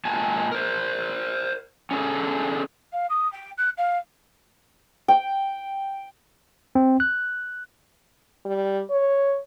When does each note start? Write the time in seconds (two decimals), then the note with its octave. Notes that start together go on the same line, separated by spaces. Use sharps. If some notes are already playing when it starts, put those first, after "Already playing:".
0.05 A#2 G#3 G#5 A5
0.52 A#4 C5
1.91 C#4 D4 G#4 A4
2.92 F5
3.10 D#6
3.32 G5
3.58 F#6
3.77 F5
5.08 G5
6.75 C4
7.00 F#6
8.46 G3
8.90 C#5